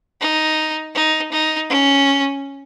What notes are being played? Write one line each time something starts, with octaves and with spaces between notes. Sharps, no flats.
D#4
D#4
D#4
C#4